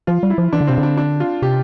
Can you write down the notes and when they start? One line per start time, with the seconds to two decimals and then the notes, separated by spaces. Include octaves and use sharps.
0.07 F3 F4
0.23 G3
0.30 E4
0.38 F3
0.53 E3 D4
0.61 D3
0.67 C3 C4
0.78 D3
0.83 D4
0.97 D4
1.20 F4
1.42 C3 G4